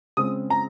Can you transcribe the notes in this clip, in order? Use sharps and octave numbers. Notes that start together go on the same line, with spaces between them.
C#3 G#3 C4 D#6
A#5